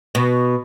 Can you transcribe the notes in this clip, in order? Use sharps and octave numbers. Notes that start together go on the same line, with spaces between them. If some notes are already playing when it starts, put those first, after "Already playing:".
B2